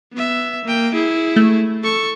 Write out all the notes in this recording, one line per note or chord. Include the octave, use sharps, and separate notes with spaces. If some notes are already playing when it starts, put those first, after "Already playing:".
B3 E5
A#3 G5
E4 G#4
A3
A4 C#6